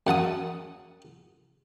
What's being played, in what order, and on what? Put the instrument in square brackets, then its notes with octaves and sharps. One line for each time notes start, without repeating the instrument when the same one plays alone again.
[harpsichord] F#2 F#5 A5 D#6